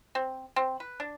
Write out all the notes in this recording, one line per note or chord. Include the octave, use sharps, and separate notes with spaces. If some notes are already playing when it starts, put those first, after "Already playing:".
C4
C4
B4
D4